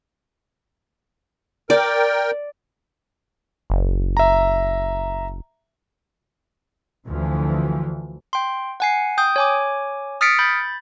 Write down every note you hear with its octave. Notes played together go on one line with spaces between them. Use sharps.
A#4 D5 G5
F#1
E5 A#5
D2 E3 F3
G5 C6
F#5 G#5 C7
G5 D#6 G6
C#5 G#5 D6
D#6 F6 A6 B6 C#7 D7
B5 G6 A6